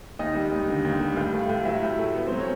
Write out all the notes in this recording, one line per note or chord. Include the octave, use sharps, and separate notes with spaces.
D#2 D#4 D#5
G3
D#2
D3
D#2
G3
A2 F4 F5
A3
A2
F#3 E4 E5
A2
A3
B3
F#3 C4 C5
C#4 C#5